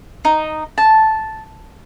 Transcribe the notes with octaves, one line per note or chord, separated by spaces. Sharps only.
D#4
A5